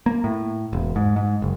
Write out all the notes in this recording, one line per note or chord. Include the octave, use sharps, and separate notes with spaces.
A#3
A2
E1
G#2
G#2
F#1